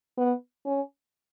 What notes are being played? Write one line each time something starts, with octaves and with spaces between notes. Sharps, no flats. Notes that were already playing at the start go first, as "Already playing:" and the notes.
B3
C#4